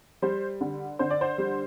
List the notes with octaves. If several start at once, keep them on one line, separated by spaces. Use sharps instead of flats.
G3 C5
D3
D3 C5
D5
C5
G3